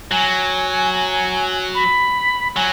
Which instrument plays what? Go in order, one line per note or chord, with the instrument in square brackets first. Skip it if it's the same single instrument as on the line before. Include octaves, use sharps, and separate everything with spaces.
[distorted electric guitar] F#3 [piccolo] G#5
[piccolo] B5
[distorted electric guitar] F#3 [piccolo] G#5